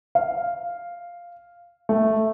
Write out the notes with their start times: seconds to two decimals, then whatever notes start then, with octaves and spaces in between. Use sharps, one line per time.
0.15 F5
1.89 A3